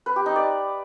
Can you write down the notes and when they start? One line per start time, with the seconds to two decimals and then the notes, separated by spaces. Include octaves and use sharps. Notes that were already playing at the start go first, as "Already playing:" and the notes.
0.06 B4
0.16 G4
0.26 D#4
0.36 D5